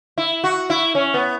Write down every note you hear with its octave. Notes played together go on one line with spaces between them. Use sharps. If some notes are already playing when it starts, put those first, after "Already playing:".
E4
F#4
E4
C#4
B3